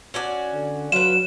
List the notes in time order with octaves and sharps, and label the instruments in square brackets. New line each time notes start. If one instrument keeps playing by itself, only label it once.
[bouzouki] C#4 F#4 D5
[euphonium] D3
[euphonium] F#3 [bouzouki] F4 B4 [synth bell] E7